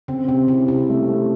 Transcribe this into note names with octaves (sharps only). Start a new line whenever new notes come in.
C#3 C4
C3 C4
C#3 E4
C3 E4
A3
A3